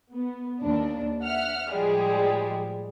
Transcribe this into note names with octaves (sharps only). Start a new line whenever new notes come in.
B3
D#2 D4
E5 F#5 F6
A2 F3 G3 G#3 G#4